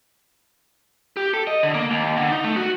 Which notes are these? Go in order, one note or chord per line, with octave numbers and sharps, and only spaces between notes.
G4
A4
D#5
D3
A#3
D#2
D3
D#4
A3
F#4